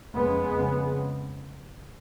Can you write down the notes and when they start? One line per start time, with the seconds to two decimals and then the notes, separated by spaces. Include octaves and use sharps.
0.17 F2 C#3 G#3 B3
0.52 F2 C#3